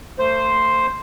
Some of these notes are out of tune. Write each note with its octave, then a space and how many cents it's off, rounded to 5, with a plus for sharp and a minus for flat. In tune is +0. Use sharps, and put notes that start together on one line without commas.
A3 +40 C5 +0